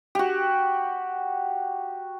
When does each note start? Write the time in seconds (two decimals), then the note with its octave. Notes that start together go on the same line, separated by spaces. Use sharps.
0.15 F#4 G4